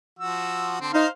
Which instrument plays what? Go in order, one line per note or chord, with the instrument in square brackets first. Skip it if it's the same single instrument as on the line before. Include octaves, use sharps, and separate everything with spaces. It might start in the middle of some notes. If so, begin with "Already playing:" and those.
[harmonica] F3 F#4 E6
D3 C4
[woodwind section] D#4 [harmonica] C5 F5 F6